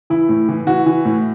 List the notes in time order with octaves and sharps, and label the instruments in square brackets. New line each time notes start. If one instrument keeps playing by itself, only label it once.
[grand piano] E3 E4
A2
E3
E3 F#4
E3
A2